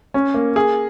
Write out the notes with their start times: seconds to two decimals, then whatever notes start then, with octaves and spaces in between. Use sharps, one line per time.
0.14 C#4
0.34 A#3
0.56 G#4